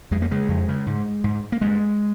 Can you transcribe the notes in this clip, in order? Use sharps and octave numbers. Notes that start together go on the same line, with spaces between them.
F2 G#3
A#3
C#3 G#3
F2
C#3
G#2
G#2
A#3
G2 G#3